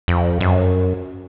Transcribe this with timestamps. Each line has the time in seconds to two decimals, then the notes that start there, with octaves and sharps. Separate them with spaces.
0.08 F2
0.41 F#2